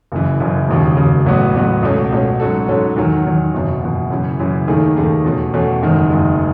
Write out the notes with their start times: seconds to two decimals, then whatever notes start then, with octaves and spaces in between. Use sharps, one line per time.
0.12 F#1 F#2 C#3 E3
0.40 F#1 F#2 C#3 E3
0.68 E1 D#2 C#3
0.97 E1 D#2 C#3
1.26 A1 A2 F#3 B3 F#4
1.54 A1 A2 F#3 B3 F#4
1.83 C#2 B2 A3 C#4
2.11 C#2 B2 A3 C#4
2.40 G#2 F#3 C#4 F#4 A4
2.68 G#2 F#3 C#4 F#4 A4
2.96 E2 D#3 F#3
3.26 E2 D#3 F#3
3.54 F#1 E2 B2
3.82 F#1 E2 B2
4.10 F#2 C#3 E3
4.40 F#2 C#3 E3
4.68 D#2 D#3 A3 D#4 G#4
4.96 D#2 D#3 A3 D#4 G#4
5.25 E2 B2 A3 C#4
5.53 E2 B2 A3 C#4
5.82 F#1 E2 D#3 G#3
6.10 F#1 E2 D#3 G#3